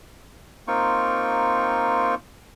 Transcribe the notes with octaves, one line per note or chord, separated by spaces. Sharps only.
A#3 C4 D#4 F4 G5 C#6